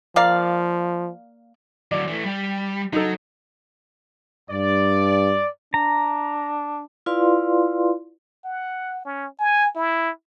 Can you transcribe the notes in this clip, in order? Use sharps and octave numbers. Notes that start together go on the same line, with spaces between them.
F3 A#3 D5 F5
D3 F#3 D5
E3 A3
G3
F#3 D#4 A4
G2 D5
D4 A#5
E4 F4 B4 D5 F5 C6
F#5
C#4
G#5
E4